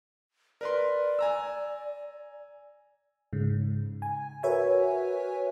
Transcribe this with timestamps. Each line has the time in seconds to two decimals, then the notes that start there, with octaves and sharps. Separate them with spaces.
0.61 A#4 B4 D5 C6
1.19 G#5 A#5 E6
3.33 G#2 C#3
4.02 G#5
4.43 F#4 A#4 B4 C#5 E5 G#5